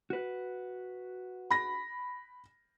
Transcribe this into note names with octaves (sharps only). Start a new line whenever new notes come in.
F#4 B4
B5 A#6